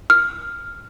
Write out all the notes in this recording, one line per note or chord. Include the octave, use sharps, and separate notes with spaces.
F6